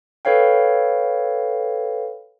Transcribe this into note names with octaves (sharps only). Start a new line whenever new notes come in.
A4 B4 C#5 F5 G5